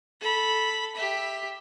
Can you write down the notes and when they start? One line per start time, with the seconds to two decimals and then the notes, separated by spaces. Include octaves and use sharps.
0.21 A4 B5
0.95 G4 E5